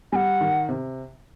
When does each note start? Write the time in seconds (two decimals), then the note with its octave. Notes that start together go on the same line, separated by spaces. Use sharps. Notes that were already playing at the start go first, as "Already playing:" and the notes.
0.12 G3 F#5 G#5
0.41 D#3
0.69 C3